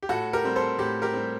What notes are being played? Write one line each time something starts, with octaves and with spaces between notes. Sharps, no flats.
G4
A2 F#4 A4
G4 A#4
G3 C4
A4 C5
A2 G4
G4 A#4
G3 C4